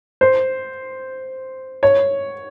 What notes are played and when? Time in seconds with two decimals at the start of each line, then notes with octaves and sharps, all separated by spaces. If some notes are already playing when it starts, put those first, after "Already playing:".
0.21 C5
1.83 C#5